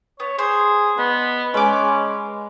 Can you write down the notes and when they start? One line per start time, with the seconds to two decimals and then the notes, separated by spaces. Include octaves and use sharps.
0.20 B3 C#5
0.39 G#4 C5
0.98 B3 D#5
1.54 G#3 C#4 B4 D6